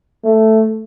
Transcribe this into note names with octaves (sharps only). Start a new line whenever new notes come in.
A3